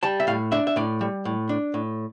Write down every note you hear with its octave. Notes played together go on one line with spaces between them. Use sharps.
G3 A5
E5
A2 F5
D4 E5
E5
A2 D5
G3
A2
D4
A2